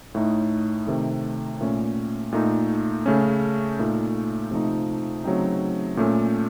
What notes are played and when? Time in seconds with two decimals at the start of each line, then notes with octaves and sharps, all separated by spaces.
0.15 A2 A3 D#4
0.87 C3 D#3 A3
1.61 A#2 A3 C#4
2.32 A#2 A3 D#4
3.06 C#3 A3 C#4
3.79 A#2 A3 D#4
4.51 C3 F3 A3 D#4
5.24 C#3 F#3 A3 C4 D#4
5.97 A#2 A3 C#4